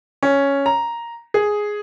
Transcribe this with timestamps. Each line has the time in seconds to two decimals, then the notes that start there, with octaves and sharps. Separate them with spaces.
0.23 C#4
0.66 A#5
1.34 G#4